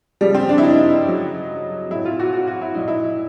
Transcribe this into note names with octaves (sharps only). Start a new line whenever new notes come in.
C#3 F3 G3
C4
D4
E4
D#4
C#3 F#3
A2 F#3 E4
F4
F#4
F#4
F#4
E4
A#2 F#3 D#4
E4